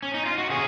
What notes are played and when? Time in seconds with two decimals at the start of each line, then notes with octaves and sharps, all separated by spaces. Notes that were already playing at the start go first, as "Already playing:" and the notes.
0.03 C#4
0.14 D#4
0.26 F4
0.38 F#4
0.50 C3 G#4